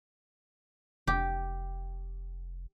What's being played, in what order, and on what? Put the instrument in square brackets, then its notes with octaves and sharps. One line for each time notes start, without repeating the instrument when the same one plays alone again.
[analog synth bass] F1 [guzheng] G4